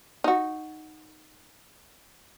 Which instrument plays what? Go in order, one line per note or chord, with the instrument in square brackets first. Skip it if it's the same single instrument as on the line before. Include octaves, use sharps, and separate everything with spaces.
[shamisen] D#4 F#4